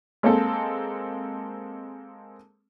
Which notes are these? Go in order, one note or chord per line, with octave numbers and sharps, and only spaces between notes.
G#3 A#3 C4 A4